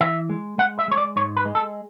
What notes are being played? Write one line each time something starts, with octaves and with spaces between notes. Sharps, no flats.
E3 E5
G#3
G#3 F#5
E5
G#3 C#5
D5
G#2 C#5
B4
G#3
A4